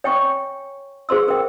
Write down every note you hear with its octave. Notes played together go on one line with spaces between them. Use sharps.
C#5 G5 G#5 C#6
G#4 C5 C6 E6
A#4 G5